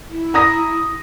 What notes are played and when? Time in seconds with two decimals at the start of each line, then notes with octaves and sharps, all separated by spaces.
0.10 E4
0.34 A#5 D#6 A#6